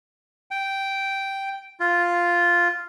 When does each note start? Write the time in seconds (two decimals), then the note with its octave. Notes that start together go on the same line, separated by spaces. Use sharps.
0.51 G5
1.80 F4